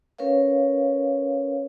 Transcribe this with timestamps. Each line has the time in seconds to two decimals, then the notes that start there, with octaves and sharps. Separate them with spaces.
0.18 C#4 A#4 B4 C#5 F5